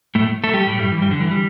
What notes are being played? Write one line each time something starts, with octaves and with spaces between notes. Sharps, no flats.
A2 A3
A3 A4
G3 G4
A2 A3
G2 G3
E3
G2 G3
D3
E3
G3